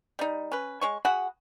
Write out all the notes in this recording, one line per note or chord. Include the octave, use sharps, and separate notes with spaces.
G3 D#4
C#4 B4
G#3 C#5 C#6
F#4 G#4 F#5 B5